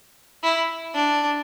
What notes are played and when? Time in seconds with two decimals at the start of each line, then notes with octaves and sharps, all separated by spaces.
0.43 E4
0.95 D4